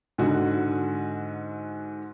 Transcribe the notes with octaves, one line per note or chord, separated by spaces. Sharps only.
G#2 D3 F#4